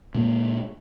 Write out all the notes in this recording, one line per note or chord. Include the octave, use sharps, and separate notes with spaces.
A#2 G#3 A#3